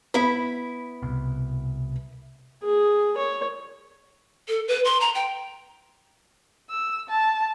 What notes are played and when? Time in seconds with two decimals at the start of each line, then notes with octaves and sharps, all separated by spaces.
0.14 B3 E4 B5
1.02 C2 B2
2.63 G#4
3.17 C#5
4.49 A4
4.68 B4
4.85 C6
5.00 A#5
5.15 G5
6.70 E6
7.09 A5